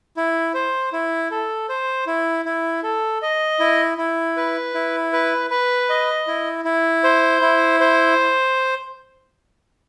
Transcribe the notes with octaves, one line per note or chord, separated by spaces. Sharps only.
E4
C5
E4
A4
C5
E4
E4
A4
D#5
E4
E4
B4
E4
B4
B4
D#5
E4
E4
C5
E4
C5